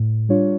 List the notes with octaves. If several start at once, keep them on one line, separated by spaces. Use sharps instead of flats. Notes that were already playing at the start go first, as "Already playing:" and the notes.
Already playing: A2
G3 D4 F4 C#5